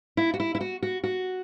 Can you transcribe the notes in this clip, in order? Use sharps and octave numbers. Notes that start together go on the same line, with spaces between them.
E4
F#4
E4
E4
F#4
F#4
F#4